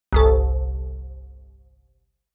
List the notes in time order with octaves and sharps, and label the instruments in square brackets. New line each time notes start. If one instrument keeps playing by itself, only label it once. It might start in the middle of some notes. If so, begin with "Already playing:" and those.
[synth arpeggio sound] G1 C2 A4